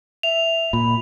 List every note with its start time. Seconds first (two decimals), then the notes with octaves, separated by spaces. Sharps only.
0.23 E5 F7
0.73 A#2 B5